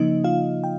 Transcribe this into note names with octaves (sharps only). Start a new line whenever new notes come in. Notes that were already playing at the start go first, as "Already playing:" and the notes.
Already playing: C#3 F3 A#3 D#4 D#5
F4 F5
G5